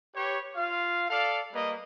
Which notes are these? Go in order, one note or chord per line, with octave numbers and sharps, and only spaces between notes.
G4 B4 C#5
F4 F5
A4 D5 F5
G3 A#3 B4 D#5